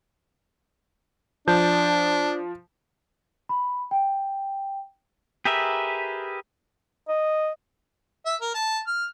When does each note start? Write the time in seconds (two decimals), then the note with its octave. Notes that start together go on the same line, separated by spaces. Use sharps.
1.48 F3 D4 A5 G6
3.49 B5
3.91 G5
5.45 G4 G#4 A#4 B4 E5
7.08 D#5
8.26 E5
8.41 A#4
8.54 A5
8.87 F6